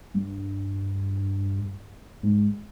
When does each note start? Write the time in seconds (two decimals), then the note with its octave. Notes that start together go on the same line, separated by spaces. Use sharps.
0.14 G2
2.23 G#2